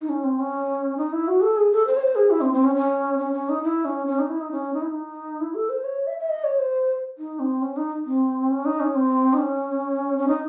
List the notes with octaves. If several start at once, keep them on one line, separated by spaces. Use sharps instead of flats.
D#4
C#4
C4
C#4
D#4
E4
F#4
A4
G#4
A4
C5
C#5
C5
G#4
E4
C4
C4
C#4
C#4
C#4
C#4
D#4
E4
C#4
C#4
D#4
E4
D#4
C#4
D#4
E4
D#4
E4
A4
C5
C#5
E5
E5
D#5
C#5
C5
D#4
C4
C#4
D#4
C4
C#4
D#4
C#4
C4
D#4
C#4
C#4
D#4